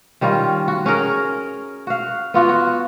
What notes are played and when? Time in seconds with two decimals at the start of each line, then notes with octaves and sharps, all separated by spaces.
0.21 D#3 G3 C#4 F4
0.68 F#4
0.86 C#4 G#4 A#4
1.87 F#4 F5
2.34 B3 F4 F#4
2.49 F#4